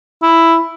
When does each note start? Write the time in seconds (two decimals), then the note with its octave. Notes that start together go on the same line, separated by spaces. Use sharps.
0.22 E4